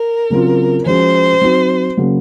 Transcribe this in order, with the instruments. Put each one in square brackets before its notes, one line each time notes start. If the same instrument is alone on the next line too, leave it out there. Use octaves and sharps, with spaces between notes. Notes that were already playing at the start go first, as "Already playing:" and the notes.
Already playing: [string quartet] A#4
[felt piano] C#3 F#3 C4 F4
[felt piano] F3 G#3 C#4 F#4 [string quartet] C5
[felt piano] F#3 C4 D#4 F#4
C#3 F#3 A#3